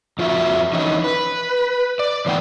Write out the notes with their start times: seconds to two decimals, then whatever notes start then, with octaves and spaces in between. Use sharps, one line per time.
0.19 F2 F4 F#4 E5
0.73 E3 C#4 D#4
1.04 B4
1.99 D5
2.26 A2 E3 B3 D#4 F#5 G5